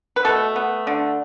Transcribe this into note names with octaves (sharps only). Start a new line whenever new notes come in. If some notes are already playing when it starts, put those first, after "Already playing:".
B4
B2 A3 A4
B3
D3